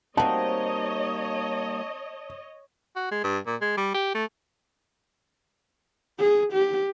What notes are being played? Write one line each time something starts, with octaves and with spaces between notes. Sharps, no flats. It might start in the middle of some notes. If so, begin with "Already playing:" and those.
G3 A#3 C4 D#4 F#4 C#5 D#5 A5
F#4
G#3
G2
A#2
G#3
G3
G4
A3
G#4
G4